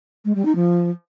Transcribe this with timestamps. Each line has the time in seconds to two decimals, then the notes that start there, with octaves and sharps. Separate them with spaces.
0.25 G#3
0.35 G3
0.45 D#4
0.55 F3